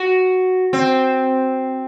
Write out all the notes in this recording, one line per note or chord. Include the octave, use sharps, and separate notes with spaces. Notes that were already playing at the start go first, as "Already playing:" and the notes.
Already playing: F#4
C4